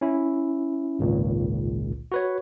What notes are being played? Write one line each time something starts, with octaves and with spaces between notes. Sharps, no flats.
C#4 E4
G#1 C#2 A#2
F#4 B4 C#5